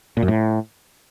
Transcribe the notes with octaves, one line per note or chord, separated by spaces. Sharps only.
A#2
F#2
A2